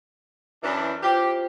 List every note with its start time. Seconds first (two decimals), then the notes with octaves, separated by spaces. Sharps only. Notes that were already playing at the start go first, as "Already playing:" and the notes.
0.63 F#2 E3 D4
1.03 F4 G4 C5 G5